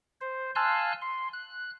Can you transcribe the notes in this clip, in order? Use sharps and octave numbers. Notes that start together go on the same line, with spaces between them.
C5
F5 G#5 A5 C6 E6 F#6
C6
F#6